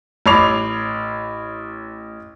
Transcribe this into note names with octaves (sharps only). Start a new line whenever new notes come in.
A1 C#5 B5 D6 C7 F7